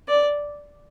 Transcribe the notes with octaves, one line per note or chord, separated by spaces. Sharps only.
D5